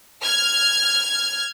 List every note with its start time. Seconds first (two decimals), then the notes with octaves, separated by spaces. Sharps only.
0.24 F6 G#6